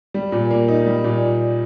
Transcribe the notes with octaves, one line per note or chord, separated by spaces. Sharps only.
G3
A#2
A#3
D#4
G3
A#2